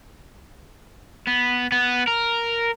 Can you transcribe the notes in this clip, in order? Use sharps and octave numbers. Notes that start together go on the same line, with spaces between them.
B3
B3
A#4